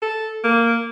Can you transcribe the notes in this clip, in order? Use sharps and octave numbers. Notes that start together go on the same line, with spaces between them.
A4
A#3